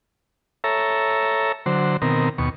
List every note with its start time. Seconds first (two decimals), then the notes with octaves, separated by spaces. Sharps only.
0.64 A4 C#5 E5 A#5
1.66 D3 F#3 C5
2.02 B2 D#3 C4 A#4
2.38 D#2 B2 C#6